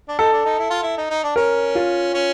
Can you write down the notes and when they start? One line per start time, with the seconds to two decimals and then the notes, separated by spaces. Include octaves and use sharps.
0.08 D4
0.19 D#4 A4
0.32 D4
0.45 D#4
0.59 E4
0.70 F4
0.83 E4
0.97 D#4
1.10 D#4
1.23 D4
1.36 C#4 A#4
1.75 F4
2.14 C#4